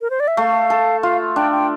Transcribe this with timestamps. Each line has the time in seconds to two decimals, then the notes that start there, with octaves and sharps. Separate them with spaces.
0.01 A#4
0.10 C5
0.20 D5
0.28 E5
0.37 A3 F5
0.70 A4
1.02 F4 F5
1.36 D4 G5
1.52 G5